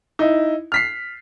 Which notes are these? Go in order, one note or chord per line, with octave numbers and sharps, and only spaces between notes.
D#4 E4
F6 B6 C7